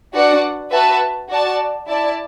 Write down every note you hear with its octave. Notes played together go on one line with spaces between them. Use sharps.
D4 F#4 B4 D5 F#5
F#4 B4 E5 A5
F#4 D5 A5
E4 D5 A5